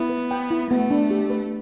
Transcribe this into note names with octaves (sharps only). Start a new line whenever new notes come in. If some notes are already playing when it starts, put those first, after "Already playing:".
Already playing: B3 E4
B4
G5
E4
A3 B3
D4
G4
B4